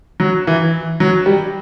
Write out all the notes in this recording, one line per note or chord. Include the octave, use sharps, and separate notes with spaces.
F#3
E3
F#3
G3